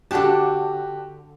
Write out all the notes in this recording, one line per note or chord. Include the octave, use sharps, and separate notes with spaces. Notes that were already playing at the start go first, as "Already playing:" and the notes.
D3 D4 F#4 G4 A5